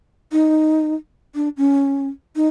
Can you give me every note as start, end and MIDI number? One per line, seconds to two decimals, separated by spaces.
0.32 0.94 63
1.35 1.49 62
1.57 2.07 61
2.36 2.48 63